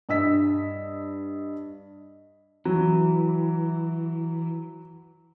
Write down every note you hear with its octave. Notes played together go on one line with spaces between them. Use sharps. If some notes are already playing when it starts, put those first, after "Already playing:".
G2 D#5 E6 B6
E3 F#3